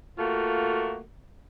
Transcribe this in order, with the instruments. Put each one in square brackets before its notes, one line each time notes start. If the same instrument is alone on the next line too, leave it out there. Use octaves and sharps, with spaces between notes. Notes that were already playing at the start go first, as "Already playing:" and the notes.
[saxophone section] A3 A#3 F4 F#4